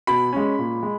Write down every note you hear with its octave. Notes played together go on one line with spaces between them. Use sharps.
B2 B5
G#3 C#4
A#2
G#3